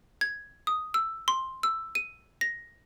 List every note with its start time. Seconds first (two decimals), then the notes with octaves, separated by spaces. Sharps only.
0.21 G#6
0.67 D#6
0.94 E6
1.28 C6
1.63 E6
1.95 D#7
2.41 A#6